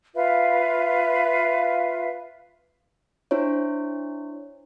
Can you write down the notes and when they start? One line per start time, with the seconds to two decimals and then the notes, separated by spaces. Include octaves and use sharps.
0.15 F4 B4 E5 F5
3.31 D4 E4 C5 C#5